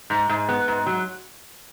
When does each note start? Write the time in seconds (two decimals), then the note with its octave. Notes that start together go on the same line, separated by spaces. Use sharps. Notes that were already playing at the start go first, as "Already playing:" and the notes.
0.10 G#2
0.29 G#2
0.49 B3
0.68 G#2
0.86 F#3